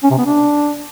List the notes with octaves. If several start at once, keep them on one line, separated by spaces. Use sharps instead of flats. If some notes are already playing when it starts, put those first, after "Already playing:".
C#4
C3
B3
D4